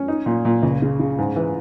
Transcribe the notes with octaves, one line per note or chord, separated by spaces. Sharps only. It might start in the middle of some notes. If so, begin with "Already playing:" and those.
Already playing: C#4
D#4
A#2
A#2
C#2
C#3
C#3
G#2
E3